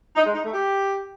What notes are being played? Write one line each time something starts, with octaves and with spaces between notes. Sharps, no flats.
D#4
G#3
D#4
A3
G4